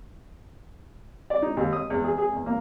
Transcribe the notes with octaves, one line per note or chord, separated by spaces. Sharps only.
D5
D#4
D#2
D#6
E2
G#4
G#4
E2
A#3